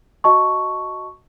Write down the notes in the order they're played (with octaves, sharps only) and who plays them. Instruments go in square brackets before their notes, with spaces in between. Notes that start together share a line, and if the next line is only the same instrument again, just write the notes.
[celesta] F#4 D#5 A5 C#6